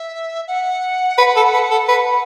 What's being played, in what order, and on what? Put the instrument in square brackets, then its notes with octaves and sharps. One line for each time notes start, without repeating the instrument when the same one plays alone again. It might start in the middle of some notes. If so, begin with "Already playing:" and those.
Already playing: [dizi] E5
F#5
[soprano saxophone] B4
A4
B4
A4
B4